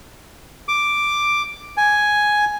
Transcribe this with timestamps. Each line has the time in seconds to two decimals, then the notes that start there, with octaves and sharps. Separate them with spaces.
0.68 D6
1.77 G#5